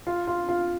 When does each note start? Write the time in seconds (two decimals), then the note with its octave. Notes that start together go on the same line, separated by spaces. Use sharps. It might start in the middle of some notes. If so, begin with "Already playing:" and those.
0.07 F4
0.27 F4
0.49 F4